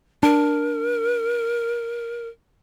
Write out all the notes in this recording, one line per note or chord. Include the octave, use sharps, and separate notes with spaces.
D4 A#4